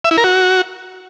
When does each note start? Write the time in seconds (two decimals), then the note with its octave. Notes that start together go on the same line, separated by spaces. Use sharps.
0.05 E5
0.11 E4
0.18 A#4
0.24 F#4